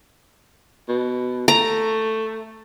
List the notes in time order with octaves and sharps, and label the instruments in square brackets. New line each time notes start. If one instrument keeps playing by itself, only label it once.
[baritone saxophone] B2
[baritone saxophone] A3 [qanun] A#5